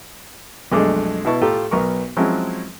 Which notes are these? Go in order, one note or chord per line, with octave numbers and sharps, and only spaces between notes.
B1 F2 G#3 A3 D4 D6
B2 B3 E4 A5 C#6
A2 A3 F4 G4 A4 A#5
B1 B3 A#4 C#6
F3 F#3 G#3 C4 C#4 E4